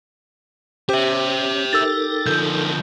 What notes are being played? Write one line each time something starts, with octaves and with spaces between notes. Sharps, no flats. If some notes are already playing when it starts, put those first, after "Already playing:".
C#4 G4 C5 C#5 E5
D#4 A4 A#4 E6 A6
D3 F3 G6